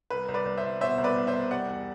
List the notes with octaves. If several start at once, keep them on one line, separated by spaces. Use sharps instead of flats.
C2 B4
C2
B4 D5
C2
C5 E5
C2
B2 C5 E5
C2
B4 D5
C2
C5 E5
C2
G3 D5 F#5
E2